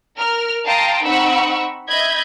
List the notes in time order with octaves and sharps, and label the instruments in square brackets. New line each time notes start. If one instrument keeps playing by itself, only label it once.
[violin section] A#4 F6
F5 G5 A5 A#5 C6 D#6
C4 D#4 F#5 B5 C#6 E6
D#5 E5 B5 G6 G#6